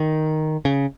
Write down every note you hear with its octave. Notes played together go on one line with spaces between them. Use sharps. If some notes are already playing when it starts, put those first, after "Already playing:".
Already playing: D#3
C#3